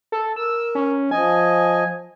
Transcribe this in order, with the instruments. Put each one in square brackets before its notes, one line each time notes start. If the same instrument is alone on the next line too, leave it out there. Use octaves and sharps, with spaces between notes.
[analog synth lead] A4
[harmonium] A#4 [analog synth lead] E6
[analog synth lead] C#4
[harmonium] F3 D#5 [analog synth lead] G#5